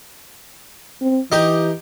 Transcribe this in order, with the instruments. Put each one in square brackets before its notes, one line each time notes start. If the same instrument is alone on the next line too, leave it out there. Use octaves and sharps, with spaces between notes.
[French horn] C4
[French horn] E3 [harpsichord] D#4 G4